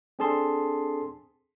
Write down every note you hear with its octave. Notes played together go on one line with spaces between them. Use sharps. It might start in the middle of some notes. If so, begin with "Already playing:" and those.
C4 D4 G#4 A4 A5 C6